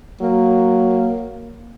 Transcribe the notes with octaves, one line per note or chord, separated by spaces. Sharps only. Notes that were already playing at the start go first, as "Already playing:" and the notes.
F#3 A#3